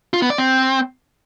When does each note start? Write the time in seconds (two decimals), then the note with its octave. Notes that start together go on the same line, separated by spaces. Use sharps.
0.14 F4
0.22 B3
0.30 D5
0.38 C4